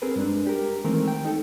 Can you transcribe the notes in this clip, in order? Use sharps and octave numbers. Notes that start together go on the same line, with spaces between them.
C4 G#4 A#4 B4
G2 G#3 D4
G4 A#4
D#3 E3 G#3 A3 C4 A#4
G5
D#4 A4